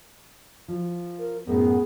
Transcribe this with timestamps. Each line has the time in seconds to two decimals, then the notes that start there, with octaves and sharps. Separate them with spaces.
0.68 F3
1.18 A#4
1.47 F#2 A2 B3 G#4